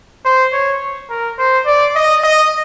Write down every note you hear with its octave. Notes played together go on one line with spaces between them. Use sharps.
C5
C#5
A#4
C5
D5
D#5
D#5